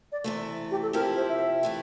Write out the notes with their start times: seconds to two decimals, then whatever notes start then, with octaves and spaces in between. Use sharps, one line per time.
0.12 D5
0.24 C3 E3 A3
0.71 G4
0.82 A4
0.93 C3 F3 C4 E4 G4 A#4
1.17 C5
1.29 E5
1.63 E3 A3 E4 G4